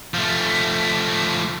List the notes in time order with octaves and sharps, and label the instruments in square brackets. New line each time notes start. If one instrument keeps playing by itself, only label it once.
[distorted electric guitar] F3 A3